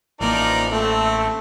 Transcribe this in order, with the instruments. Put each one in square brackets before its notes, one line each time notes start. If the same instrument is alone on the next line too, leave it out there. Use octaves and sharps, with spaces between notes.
[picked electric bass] A1 A#3 [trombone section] E3 F3 [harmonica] D#4 A#4 D5
[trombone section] A3 [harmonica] C4